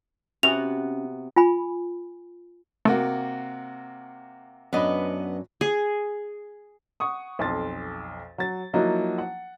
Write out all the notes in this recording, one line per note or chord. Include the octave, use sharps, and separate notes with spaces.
C3 B3 C#4 F#4 F7
F4 G#5 B5
C3 A3 A#3 F#4
F#2 B3 D4 B4 D#5
G#4
F#5 C#6 D#6
B1 F2 A5 C6 A6
F#3 A6
F3 F#3 A#3 D#4 E4 F#4
F#5